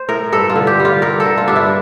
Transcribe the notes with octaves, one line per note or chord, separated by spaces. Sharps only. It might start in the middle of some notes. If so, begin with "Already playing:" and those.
Already playing: C5
A2 A#4
G2 A4
F4
D3
G4
G3
F4
G2 A#4
A4
D3
F4
G2 D4
E4